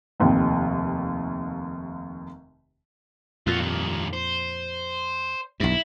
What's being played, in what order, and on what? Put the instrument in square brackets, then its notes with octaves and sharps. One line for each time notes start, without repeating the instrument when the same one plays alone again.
[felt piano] F1 D#2 C3
[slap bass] F2 A#2 [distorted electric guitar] F4 F#4
[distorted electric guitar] G2 D#3
C5
[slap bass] B1 G2 [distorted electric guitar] E4